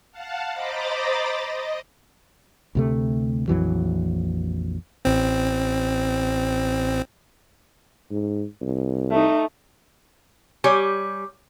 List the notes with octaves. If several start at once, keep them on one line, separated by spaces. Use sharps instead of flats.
F5 F#5 A5
C5 D#5 A#5 B5 D6 A6
D#5
D2 C3 A3
A#1 F2 E3 F#3
A1 C4
G#2
C2
A3 D#4
G3 G4 C#5 G#5